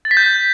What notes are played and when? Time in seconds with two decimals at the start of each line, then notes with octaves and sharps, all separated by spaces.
0.05 A6
0.11 B6
0.17 G6